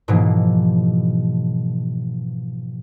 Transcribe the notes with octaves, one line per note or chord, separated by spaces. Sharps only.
G#2 B2 E3 F3 A#3